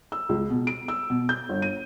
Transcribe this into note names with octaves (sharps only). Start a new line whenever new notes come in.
E6
C#2
B2
D7
E6
B2
G6
G1
D#7